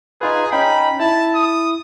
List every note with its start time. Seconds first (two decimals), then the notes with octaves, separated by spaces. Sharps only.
0.21 D#4 F4 G#4 B4
0.52 C#4 D#4 G5 B5
1.00 E4 A5
1.35 D#6